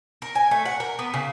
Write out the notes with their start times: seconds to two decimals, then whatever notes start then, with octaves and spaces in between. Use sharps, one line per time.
0.22 A#4
0.35 G#5
0.51 A3
0.65 F#5
0.80 A#4
0.99 B3
1.14 C#3